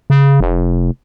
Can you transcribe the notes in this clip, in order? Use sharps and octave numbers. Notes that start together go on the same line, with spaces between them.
C#3
F1